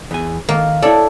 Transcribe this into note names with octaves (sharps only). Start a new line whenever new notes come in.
E2 G#5
D#3 A#3
E4 A4 C#5 D5